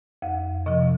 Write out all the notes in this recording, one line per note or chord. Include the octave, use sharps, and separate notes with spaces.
F2 F5
C3 F3 D#5